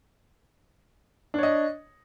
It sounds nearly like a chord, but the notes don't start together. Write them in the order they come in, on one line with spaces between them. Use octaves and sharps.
D4 C#5 D#5